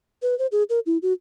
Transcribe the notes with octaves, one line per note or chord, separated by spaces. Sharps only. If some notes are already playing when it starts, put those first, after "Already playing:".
B4
C5
G#4
A#4
E4
F#4